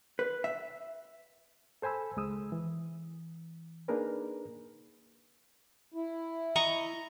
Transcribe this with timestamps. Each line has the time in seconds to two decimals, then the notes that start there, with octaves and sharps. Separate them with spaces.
0.19 B4
0.44 E5
1.82 A4 C5 G#5 B5 E6
2.17 C#2 G#3 D#6 E6
2.52 E3
3.88 A#3 D4 D#4 G#4 A#4 B4
5.94 E4
6.56 D#5 A#5 C#6